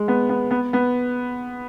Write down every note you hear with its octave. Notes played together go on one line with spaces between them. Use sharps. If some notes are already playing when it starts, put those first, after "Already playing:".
Already playing: G#3
B3
B3
B3
B3